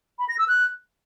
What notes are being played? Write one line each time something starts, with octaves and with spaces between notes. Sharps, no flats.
B5
A#6
E6
F#6